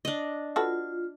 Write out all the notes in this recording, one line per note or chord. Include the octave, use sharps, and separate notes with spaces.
D4 D#5
F4 F#4 A4 B4